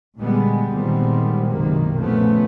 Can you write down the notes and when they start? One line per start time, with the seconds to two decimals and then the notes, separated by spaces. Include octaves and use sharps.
0.17 A#2 D3 G3 G#3 B3
0.70 A#2 D#3 G3 G#3 B3 C4
1.47 F#1 B1 C3 D#3 A#3
1.99 A#2 C#3 F3 A3 B3